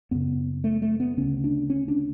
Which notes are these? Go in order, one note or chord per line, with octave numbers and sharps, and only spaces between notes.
F#2 C#3 B3
A3
A3
B3
D2 C#3 C#4
D4
C#4
D4